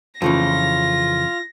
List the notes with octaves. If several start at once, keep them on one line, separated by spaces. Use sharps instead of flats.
F2 C#3 E3 F4 A#6